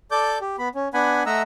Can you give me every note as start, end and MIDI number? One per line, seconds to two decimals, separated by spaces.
0.11 0.38 69
0.11 0.38 74
0.11 0.38 86
0.11 0.38 91
0.41 0.56 67
0.59 0.69 59
0.59 0.69 83
0.75 0.88 61
0.94 1.23 59
0.94 1.23 62
0.94 1.23 78
0.94 1.23 80
0.94 1.23 83
1.26 1.42 57
1.26 1.42 75
1.26 1.42 76
1.26 1.42 78
1.26 1.42 82
1.26 1.42 88